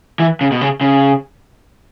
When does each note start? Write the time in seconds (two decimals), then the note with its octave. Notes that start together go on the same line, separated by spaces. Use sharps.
0.19 E3
0.41 C#3
0.52 B2
0.61 C#3
0.81 C#3